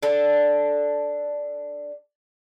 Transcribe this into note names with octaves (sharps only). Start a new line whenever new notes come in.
D4 A4